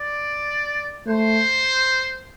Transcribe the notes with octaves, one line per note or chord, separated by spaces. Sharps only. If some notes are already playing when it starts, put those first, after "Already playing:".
Already playing: D5
A3 C5